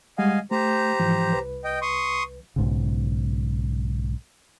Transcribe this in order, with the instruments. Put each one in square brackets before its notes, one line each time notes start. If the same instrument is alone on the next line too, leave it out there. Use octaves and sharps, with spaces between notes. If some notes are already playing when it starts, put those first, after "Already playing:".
[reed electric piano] G3 G#3 F#5 [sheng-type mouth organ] D#5 F5 G#5
[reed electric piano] A3 [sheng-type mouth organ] G4 C5 A#5
[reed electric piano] G#2 E3 F3
C2 B4
[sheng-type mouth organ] D#5 G5
C6 C#6 D#6
[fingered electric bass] B1 G#2 C#3